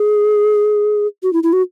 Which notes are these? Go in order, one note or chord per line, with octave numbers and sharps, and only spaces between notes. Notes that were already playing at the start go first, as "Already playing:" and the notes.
Already playing: G#4
F#4
E4
E4
F#4